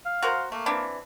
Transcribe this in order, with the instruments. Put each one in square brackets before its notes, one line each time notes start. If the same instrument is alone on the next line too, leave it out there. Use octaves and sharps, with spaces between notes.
[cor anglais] F5
[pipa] F#4 A#4 C5
[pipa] A3 [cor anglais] A#3
[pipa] E3 C4 D4